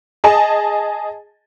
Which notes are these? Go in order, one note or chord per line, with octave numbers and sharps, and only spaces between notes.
G#4 D#5 G#5 A5